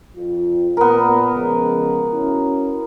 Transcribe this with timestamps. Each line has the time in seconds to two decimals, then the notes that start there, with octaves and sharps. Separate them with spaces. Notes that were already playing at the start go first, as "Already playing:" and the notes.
0.16 F2 F4
0.77 A#2 B3 A#4
1.34 C#3 F3 G#3
2.11 C#4 E4 F#4